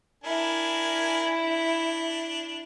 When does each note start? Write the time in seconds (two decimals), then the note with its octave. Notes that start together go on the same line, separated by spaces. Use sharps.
0.24 D4 E4 A#4 G#5
1.35 D4